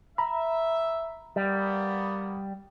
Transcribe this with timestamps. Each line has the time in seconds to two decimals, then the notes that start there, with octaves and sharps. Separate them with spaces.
0.18 E5 A#5 B5
1.36 G3 A#3 B3